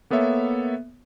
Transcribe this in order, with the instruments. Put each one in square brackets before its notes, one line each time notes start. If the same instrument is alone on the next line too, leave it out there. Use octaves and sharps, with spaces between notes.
[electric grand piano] A#3 B3 A4 C#5 E5